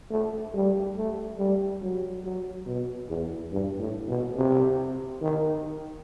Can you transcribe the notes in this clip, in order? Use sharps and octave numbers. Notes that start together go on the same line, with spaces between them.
A3
G3
A3
G3
F#3
F#3
B2
E2
G2
A2
B2
C3
D#3